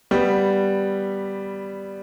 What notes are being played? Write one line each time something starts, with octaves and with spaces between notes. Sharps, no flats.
G3 B3